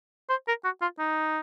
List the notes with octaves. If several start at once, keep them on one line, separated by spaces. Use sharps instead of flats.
C5
A#4
F#4
F4
D#4